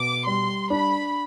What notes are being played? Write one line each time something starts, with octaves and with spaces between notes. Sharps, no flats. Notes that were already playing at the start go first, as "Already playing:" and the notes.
Already playing: B2 D6
G3 C6
D4 B5